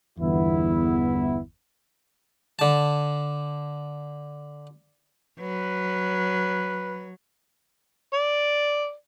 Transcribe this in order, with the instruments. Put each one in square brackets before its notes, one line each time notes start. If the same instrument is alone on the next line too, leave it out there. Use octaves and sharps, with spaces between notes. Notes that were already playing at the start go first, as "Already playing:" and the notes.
[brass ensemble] G1 E2 B3 E4
[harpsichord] D3 A5
[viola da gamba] F#3 [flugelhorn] B4
[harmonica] D5